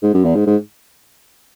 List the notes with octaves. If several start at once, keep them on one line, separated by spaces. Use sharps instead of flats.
G#2
F#2
E2
G#2
G#2